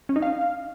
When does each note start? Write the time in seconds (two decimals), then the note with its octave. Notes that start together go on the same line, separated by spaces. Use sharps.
0.09 C#4
0.16 D#4
0.22 F5